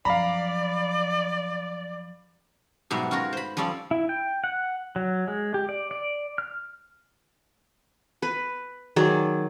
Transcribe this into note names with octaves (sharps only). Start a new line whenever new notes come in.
F#2 F3 D5 F5 A#5 B5
G#2 B2 F#3 G3 E5
C#4 F4 F#4 A#4
C5 B5
F3 G3 C#4 A4 D5
E4
G5
F#5
F#3
G#3
G4
D5
D5
F6
B4
D#3 F#3 G#4 D5